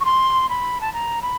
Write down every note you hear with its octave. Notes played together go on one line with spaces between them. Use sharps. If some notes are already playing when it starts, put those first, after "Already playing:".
C#6
C6
B5
A5
A#5
B5